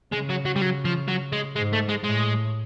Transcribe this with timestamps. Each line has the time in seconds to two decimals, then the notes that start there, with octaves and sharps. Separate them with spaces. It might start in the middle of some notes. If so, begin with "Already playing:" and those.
0.13 C#3 G#3
0.30 F#3
0.46 F#3
0.56 G3
0.62 F#3
0.85 F3
1.08 F#3
1.33 G#3
1.56 G#2 G#3
1.73 A3
1.89 G#3
2.04 A2 G#3